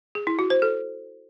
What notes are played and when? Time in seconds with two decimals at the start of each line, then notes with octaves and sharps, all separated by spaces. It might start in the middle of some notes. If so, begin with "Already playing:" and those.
0.15 G#4
0.27 E4
0.39 F#4
0.50 C5
0.62 A4